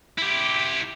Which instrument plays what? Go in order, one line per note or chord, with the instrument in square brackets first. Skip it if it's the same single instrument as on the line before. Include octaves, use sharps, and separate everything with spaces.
[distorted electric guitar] E4 G4